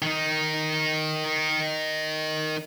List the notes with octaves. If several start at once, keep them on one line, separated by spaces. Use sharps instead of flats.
D#3 D#4